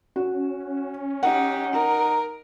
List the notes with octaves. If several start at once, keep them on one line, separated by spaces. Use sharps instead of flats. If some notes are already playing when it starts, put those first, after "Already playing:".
C#4 F#4
D#4 G4 F#5
D#4 A#4